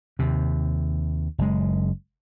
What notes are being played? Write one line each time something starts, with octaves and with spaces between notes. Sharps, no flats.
D#2 C3
F#1 G#3